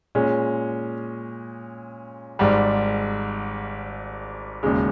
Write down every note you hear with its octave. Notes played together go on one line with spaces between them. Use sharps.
A#2 G#3 C#4 G#4
G#1 G#2 G3
E1 D#2 C#3 G#3